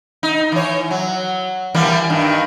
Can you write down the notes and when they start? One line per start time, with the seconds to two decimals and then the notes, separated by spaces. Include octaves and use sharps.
0.23 D#4
0.52 E3 C#5
0.91 F#3
1.75 E3 G3 A#3
2.10 G2 D#3